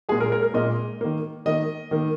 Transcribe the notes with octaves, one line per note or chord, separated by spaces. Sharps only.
A#2 G#3 G#4
A#4
A#4
A#4
A#2 G#3 D#5
D#3 A#3
D#3 A#3 D#5
D#3 A#3